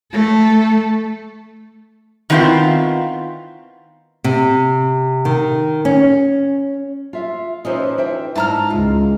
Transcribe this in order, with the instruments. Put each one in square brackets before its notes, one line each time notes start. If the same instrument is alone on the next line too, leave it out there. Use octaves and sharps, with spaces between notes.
[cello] A3 A4
[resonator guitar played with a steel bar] D#3 F#3 B3 C4 E4 F4
[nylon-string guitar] C3
D#3
C#4
F4 E5 F5
[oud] E3 F3 D#4 [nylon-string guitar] C#4 C5 C#5
[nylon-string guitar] C5 E5 G5
[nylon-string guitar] G#2 E4 [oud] C#4 D4 [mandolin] A5 A#5 F6
[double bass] C#2 G#3 [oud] F4